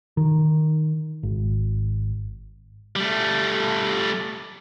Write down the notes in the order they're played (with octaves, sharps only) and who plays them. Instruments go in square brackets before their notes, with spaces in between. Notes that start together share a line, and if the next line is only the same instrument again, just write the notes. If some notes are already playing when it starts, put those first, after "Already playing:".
[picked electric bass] D#3
G#1
[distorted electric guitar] G3 A3